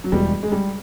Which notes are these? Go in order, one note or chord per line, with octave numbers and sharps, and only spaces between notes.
F#3
E1 E2 B2 G3 G#3
G#3
G3